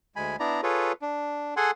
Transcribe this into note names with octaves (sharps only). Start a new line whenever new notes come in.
D2 G#3 G#5 B5
B3 D4 E4 D5 A#5
F4 G#4 A4 B4 C#5
D4
G#4 A4 F#5 G#5 C6